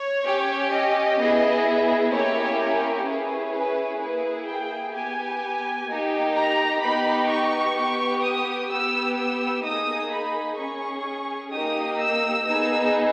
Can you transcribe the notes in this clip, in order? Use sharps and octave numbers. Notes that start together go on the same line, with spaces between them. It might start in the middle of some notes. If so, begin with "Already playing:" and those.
Already playing: C#5
C#4 G4
D#5
B3 E4 G#4
A#3 C#4 E4 G4 C#5
A#4
C#4 E4 G#4 B4
B4
A#3 E4 G#4 B4
G5
B3 G4 G#5
A#3 D#4 G4
A#5
B3 D#4 G4 B5
C#6
B3 G4
D#6
B3 G4 E6
E6
A#3 D#4 G#4 D#6
B5
C#4 G#4 C#6
A#3 D#4 G4 D#6
E6
B3 D#4 G#4 E6